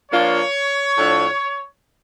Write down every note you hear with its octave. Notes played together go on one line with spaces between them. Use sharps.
F3 A#3 D4 F4 C#5
A2 F3 A3 D4 F4